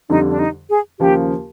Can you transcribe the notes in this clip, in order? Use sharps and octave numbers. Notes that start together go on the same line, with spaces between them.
F2 D3 G3 D#4
D4
D#4
G#4
D#2 C#3 F3 A#3 G4